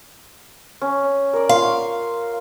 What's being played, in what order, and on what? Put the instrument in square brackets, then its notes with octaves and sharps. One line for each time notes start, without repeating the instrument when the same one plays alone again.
[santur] C#4
A#4 D5
[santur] F4 [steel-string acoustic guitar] F5
[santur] C#6